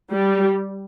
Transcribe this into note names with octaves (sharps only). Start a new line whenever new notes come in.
G3